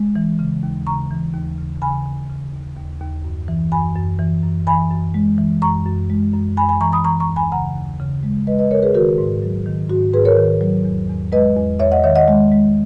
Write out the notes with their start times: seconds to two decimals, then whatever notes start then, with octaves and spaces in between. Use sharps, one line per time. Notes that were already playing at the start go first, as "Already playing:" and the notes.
Already playing: G#3
0.16 E3
0.39 C#3
0.63 D#2
0.87 C#3 A#5 C#6
1.11 E3
1.34 D#2
1.58 C#3
1.82 C#3 G#5 B5
2.06 C#3
2.29 C#3
2.53 D#2
2.77 D#2
3.01 D#2
3.24 F#2
3.48 E3
3.72 F#2 G#5 B5
3.96 F#2
4.19 E3
4.43 F#2
4.67 E3 G#5 B5
4.91 F#2
5.14 G#3
5.38 E3
5.62 F#2 A#5 C#6
5.86 F#2
6.10 G#3
6.33 F#2
6.57 F#2 G#5 B5
6.69 G#5 B5
6.81 E3 A#5 C#6
6.92 B5 D#6
7.04 E3 A#5 C#6
7.20 A#5 C#6
7.29 D#2
7.36 G#5 B5
7.52 C#3 F#5 A#5
7.76 D#2
8.00 C#3
8.23 G#3
8.47 G#3 B4 D#5
8.59 B4 D#5
8.71 C#3 A#4 C#5
8.82 G#4 B4
8.95 D#3 F#4 A#4
9.18 G#2
9.42 F#3
9.66 D#3
9.90 G#2 F#4
10.14 G#2 G#4 B4
10.25 A#4 C#5
10.37 D#3
10.61 F#3
10.85 E2
11.09 E2
11.32 G#3 B4 D#5
11.56 E2
11.79 E2 C#5 E5
11.92 D#5 F#5
12.04 D#3 C#5 E5
12.16 D#5 F#5
12.28 G#3
12.51 G#3